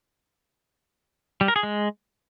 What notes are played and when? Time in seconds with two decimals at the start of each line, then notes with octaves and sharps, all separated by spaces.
1.41 G3
1.48 A#4
1.56 G#4
1.63 G#3